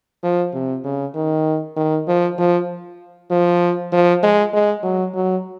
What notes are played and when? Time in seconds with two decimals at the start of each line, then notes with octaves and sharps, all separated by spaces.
0.23 F3
0.53 C3
0.84 C#3
1.15 D#3
1.76 D#3
2.07 F3
2.38 F3
3.30 F3
3.92 F3
4.23 G#3
4.53 G#3
4.83 F#3
5.15 F#3